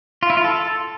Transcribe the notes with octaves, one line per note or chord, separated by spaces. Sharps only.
F4
E4
F4
A4